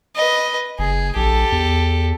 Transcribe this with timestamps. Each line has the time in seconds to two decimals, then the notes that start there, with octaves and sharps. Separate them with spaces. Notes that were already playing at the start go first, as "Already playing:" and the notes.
0.15 B4 D#5
0.79 F#1 G#4
1.16 A#1 G4 A4
1.52 E2